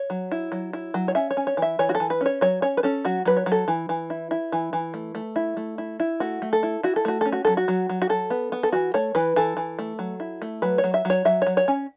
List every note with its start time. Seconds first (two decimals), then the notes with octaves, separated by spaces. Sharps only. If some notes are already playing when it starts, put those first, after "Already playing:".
Already playing: C#5
0.10 F#3
0.32 E4
0.52 F#3
0.73 E4
0.94 F#3
1.08 C#5
1.15 C#4 E5
1.31 C#5
1.37 C#4
1.47 C#5
1.57 E3
1.62 E5
1.79 E3 C#5
1.89 F#4
1.95 A4
2.00 E3
2.10 B4
2.21 C#4 C#5
2.41 F#3 C#5
2.62 C#4 C#5
2.77 B4
2.83 C#4 A4
3.05 F#3 F#4
3.25 F#3 B4
3.37 C#5
3.46 F#3
3.52 A4
3.68 E3
3.89 E3
4.10 E4
4.31 E4
4.52 E3
4.73 E3
4.94 A3
5.15 A3
5.36 E4
5.57 A3
5.78 E4
6.00 E4
6.20 A3 F#4
6.42 A3
6.53 A4
6.63 E4
6.83 E4 F#4
6.96 A4
7.05 A3 F#4
7.21 C#4 A4
7.33 F#4
7.45 F#3 A4
7.57 F#4
7.68 F#3
7.90 F#3
8.02 F#4
8.09 F#3 A4
8.30 B3
8.52 B3
8.63 A4
8.73 E3 F#4
8.94 A3 C#5
9.15 E3 B4
9.36 E3 A4
9.57 E3
9.79 A3
9.99 F#3
10.20 E4
10.42 A3
10.62 F#3 B4
10.78 C#5
10.84 F#3
10.94 E5
11.05 F#3 C#5
11.25 F#3 E5
11.42 F#3 C#5
11.57 C#5
11.68 C#4